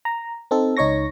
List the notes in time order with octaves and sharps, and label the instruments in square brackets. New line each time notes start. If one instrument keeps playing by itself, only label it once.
[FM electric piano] A#5
C4 D#4 A4
C#2 D#4 C#5 C#6 A#6